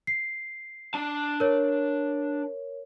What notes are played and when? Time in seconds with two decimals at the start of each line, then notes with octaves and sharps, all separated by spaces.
0.07 C7
0.94 D4 A5
1.40 A#4 C#5